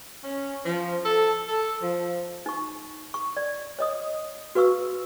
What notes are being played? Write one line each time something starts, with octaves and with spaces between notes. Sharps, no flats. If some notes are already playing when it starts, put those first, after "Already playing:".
C#4
F3
A4
A4
F3
D#4 C#6
C#6
D5
C#5 D#5 D#6
F#4 B4 F5 C#6 E6